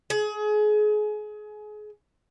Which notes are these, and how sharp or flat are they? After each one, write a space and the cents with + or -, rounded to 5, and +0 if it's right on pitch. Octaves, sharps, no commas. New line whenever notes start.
G#4 +30